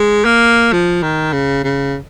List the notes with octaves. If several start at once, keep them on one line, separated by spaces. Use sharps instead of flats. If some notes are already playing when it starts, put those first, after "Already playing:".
Already playing: G#3
A#3
F3
D#3
C#3
C#3